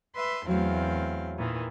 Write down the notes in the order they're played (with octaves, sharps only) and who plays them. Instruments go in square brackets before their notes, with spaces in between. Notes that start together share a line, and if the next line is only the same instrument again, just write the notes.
[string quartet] B4 E5 C6
[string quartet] E2 C4 F5 [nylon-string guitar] F#3 A3
[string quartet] A#2 D#3 E3